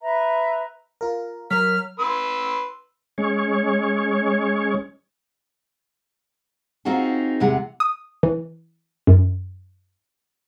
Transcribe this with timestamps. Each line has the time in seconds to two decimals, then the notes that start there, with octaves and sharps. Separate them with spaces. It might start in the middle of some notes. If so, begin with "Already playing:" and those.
0.01 B4 E5 A#5
1.01 F4 A#4
1.51 F#3 A#4 F6 B6
1.99 B4 C6 E6
3.18 G#3 C#4 C#5
6.85 C4 D#4 F4 F#4 G#4
7.40 E2 C3 G#3 F#5
7.80 D#6
8.23 E3
9.07 F#2